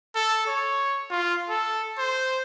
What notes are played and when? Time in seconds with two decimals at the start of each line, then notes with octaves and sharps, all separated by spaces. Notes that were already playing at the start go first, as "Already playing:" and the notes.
0.15 A4
0.47 C#5
1.10 F4
1.50 A4
1.99 C5